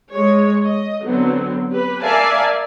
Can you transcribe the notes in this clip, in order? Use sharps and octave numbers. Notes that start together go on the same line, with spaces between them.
G#3 C#5
D#5
D3 F#3 B3 C4
G4 B4
A#4 D5 E5 F5 G#5 A5